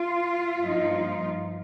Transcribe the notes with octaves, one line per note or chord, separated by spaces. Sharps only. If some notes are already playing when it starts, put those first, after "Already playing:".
Already playing: F4
G2 F3 A#3 D#4